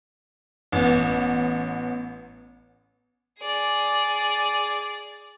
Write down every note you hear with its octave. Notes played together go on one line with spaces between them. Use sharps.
A1 B3
G#4 D5